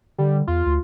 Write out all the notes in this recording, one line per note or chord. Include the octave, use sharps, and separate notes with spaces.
D3 G3
E2 F4
D2